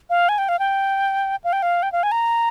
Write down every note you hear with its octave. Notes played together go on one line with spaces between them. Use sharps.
F5
G#5
G5
F5
G5
F5
G5
F5
G5
F5
G#5
A#5